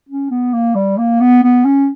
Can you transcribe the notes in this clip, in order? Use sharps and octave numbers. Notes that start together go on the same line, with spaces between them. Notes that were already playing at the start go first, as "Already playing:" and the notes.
C#4
B3
A#3
G3
A#3
B3
B3
C#4